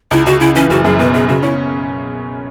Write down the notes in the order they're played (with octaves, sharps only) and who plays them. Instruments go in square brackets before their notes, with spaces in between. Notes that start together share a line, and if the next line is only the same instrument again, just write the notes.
[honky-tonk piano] C#2 [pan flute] E4
[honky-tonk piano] C#2 [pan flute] F#4
[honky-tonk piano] C#3 [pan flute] E4
[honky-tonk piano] E3 [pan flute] C#4
[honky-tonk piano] F#1 [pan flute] F#4
[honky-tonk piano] F#2 [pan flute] G#4
[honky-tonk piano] B2 [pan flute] B4
[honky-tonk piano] B2 [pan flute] G#4
[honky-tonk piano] C#3 [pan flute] F#4
[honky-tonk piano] C#4 [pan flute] E4